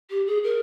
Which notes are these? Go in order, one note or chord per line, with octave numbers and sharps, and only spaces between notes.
G4
G#4
A#4